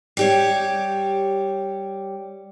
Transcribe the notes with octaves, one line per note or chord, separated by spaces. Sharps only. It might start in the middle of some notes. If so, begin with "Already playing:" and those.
G3 G4 C#5